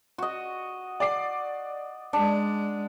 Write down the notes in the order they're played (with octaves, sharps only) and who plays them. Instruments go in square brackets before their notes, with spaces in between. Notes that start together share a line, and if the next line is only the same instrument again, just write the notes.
[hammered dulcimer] F#4 D#5
[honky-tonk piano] D5 D6 C7
[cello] G#3 [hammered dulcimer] D4